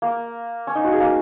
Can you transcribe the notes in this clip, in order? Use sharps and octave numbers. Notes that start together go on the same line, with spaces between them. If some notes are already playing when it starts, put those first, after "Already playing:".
A#3
C#4
D#4
F#4
G#4
A#3